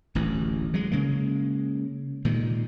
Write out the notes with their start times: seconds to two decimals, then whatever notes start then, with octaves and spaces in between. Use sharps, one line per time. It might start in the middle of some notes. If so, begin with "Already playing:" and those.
0.15 D1 A1 E3
0.74 F#3 G#3
0.92 C#3 G#3 A#3
2.25 A#2 D#3 G#3